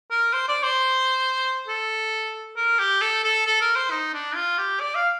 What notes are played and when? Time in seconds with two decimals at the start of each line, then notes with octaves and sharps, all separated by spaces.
0.11 A#4
0.33 C5
0.48 D5
0.63 C5
1.68 A4
2.57 A#4
2.79 G4
3.01 A4
3.24 A4
3.47 A4
3.61 A#4
3.76 C5
3.91 D#4
4.14 D4
4.35 F4
4.58 G4
4.80 D5
4.95 F5